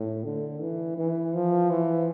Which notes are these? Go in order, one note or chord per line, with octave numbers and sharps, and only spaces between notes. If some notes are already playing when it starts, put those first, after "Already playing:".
Already playing: A2
D3
E3
E3
F3
E3